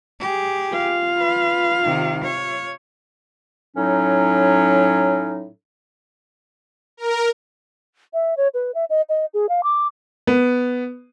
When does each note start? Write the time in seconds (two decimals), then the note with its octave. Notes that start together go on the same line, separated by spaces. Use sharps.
0.20 G4 G#4
0.72 F4 F5
1.17 B4
1.83 C3 D#3
2.23 C#5
3.77 A2 F#3 C#4 D#4
6.97 A#4
8.14 E5
8.37 C#5
8.54 B4
8.75 E5
8.90 D#5
9.09 D#5
9.34 G#4
9.49 F5
9.63 D6
10.27 B3